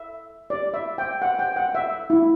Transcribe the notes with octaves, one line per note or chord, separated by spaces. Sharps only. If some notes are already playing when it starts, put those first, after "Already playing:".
Already playing: E5
D5
E5
G5
F#5
G5
F#5
E5
E4